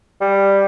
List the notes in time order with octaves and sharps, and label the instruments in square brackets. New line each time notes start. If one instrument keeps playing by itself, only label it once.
[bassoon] G3